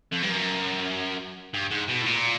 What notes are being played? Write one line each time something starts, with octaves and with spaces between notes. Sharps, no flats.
F2
G2
F#2
G2
G#2
B2
A2
A#2